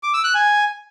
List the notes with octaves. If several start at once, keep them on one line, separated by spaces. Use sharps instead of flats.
D6
E6
F#6
G#5